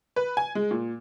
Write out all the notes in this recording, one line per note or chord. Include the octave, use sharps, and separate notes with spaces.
B4
G#5
G#3
A#2